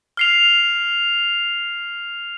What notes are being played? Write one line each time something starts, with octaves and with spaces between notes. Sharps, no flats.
F6 C7 F7